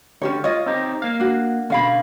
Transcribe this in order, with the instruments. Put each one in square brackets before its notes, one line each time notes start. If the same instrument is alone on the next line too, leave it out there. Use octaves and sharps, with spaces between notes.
[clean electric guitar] D3 [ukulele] C#4 G4 C#5
[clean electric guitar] F4 [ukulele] C#5 D#5
[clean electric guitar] C4 D#4 G4
A#3 F5
[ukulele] D4 F#4
[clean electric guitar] B2 D3 [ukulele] C#4 F5 B5